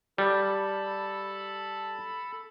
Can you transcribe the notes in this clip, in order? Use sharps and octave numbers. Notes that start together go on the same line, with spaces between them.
G3 A4 A5 B5